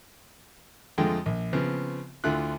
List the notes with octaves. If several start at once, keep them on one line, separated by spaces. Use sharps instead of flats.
F2 D3 G#3 A3 F4 G5
A#1
C#3 F3 B3 C4
D2 D3 A3 E4 F4 F#6